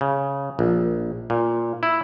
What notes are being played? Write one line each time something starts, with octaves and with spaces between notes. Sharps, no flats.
C#3
A#1
A#2
E4